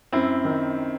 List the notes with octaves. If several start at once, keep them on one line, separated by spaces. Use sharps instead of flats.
F#2 C4 E4
D#3